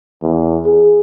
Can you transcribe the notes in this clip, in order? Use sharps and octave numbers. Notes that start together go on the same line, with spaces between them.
E2
G#4